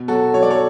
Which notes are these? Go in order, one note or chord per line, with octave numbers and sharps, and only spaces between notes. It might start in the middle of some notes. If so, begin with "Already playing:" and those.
Already playing: B2
F#3 F#4 A4
F#3 C#5
D5
A4 C#5